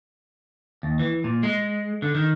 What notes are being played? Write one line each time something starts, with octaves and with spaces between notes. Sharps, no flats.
D#2
E3
A#2
G#3
D3
D#3